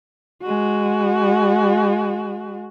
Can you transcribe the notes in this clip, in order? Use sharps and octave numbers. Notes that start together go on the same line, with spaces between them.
G#3 F#4